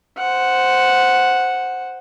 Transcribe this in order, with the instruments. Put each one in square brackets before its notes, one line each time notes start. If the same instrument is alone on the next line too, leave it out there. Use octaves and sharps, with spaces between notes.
[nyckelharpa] C5 F#5